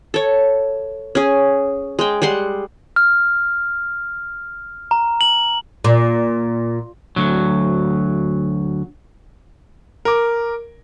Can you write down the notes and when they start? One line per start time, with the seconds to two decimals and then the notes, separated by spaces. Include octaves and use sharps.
0.14 A4 C#5
1.15 C#4 G#4
1.99 G#3 G5
2.22 G3 G#3 F#5 C6
2.96 F6
4.91 A#5
5.21 F#7
5.84 A#2
7.16 D2 F#3
10.05 A#4 D6